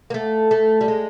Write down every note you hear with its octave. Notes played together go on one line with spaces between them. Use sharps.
A#3
A3
A3
G3
G#3